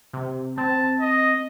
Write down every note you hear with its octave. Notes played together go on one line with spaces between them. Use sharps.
C3
C4 A5
D#5